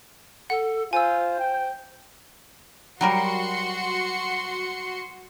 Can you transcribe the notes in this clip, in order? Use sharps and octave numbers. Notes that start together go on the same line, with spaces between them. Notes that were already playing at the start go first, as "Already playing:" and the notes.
A4 F#5
F4 C5 G#5 E6
G5
F#3 G3 F#4 A#4 C6 C#7